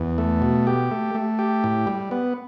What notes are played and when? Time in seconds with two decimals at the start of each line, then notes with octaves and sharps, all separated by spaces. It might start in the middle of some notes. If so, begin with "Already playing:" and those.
Already playing: E2
0.18 A3
0.42 B2
0.67 G4
0.91 A3
1.15 A3
1.39 G4
1.64 A2
1.87 G3
2.11 B3